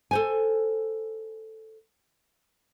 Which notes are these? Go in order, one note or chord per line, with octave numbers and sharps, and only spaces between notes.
A4 C5 G#5